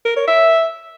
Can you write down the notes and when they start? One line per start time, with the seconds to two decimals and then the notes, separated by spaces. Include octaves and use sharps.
0.05 A#4
0.16 C#5
0.28 E5